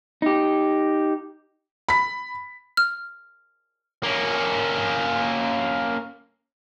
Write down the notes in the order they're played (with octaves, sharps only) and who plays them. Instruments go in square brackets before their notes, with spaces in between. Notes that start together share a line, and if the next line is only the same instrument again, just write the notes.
[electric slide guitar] D#4 G4
[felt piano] B5 B6
[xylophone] F6
[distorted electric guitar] A#3 C#4